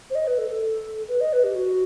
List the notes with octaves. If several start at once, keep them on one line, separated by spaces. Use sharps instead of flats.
C5
D#5
B4
A4
A4
B4
D#5
B4
G4
F#4